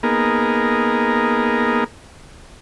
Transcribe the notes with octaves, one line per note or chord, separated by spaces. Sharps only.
A#3 B3 D#4 G#4 A#4